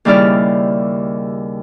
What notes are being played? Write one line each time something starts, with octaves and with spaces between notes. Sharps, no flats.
D#2 C#3 G3 E4 D5 F6